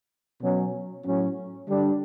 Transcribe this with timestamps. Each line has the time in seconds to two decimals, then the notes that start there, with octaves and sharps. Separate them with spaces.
0.43 B2 F#3 C#4
1.05 A2 F#3 C#4
1.69 D3 G3 D4